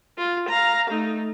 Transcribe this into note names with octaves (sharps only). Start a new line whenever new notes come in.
F4
F5 A#5
A3 D#4